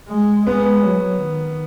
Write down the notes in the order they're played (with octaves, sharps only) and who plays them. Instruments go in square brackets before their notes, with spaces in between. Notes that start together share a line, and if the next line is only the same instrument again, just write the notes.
[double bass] G#3
[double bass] G#3 [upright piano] B3
[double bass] F#3
D#3